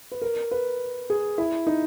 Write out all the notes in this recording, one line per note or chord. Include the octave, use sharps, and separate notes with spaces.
B4
A#4
B4
G#4
E4
D#4